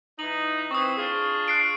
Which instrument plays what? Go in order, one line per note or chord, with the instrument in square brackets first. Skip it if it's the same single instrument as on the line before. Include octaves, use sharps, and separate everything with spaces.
[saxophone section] E3 D#4 [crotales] F#7
[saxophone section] E3 C4 [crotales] C#6 D#6
[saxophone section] D4 F4 G#4
[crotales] F#6 C7 D7